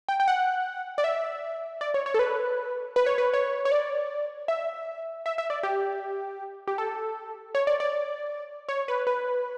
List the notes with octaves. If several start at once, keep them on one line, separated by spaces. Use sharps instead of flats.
G5
G5
F#5
D5
E5
D5
C#5
C#5
A4
B4
B4
C#5
B4
C#5
C#5
D5
E5
E5
E5
D5
G4
G4
A4
C#5
D5
D5
C#5
B4
B4